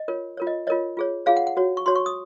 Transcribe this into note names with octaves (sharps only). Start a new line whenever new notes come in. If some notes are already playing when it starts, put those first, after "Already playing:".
Already playing: D#5
F4 A#4 C#5
F4 A#4 C#5
D#5
F4 A#4 C#5 D#5
F4 G#4 C#5
F4 G#4 C#5 F5
F#5
F#5
F#4 C#5
C#6
F#4 C#5 C6
C#6
D#6